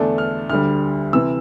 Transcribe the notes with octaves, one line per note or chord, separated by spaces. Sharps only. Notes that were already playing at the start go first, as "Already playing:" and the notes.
Already playing: E2 D3 A3 D4
F6
D2 D3 G3 F6
C3 E3 E6